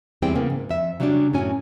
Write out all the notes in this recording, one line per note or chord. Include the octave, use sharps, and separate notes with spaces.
E2 G3 C4 E4 G#4 G5
C#3 A#3 B3
G#2
F2 E5
C#3 F#3 G3 C4 D4
F#2 A2 F#3 C#4 G#5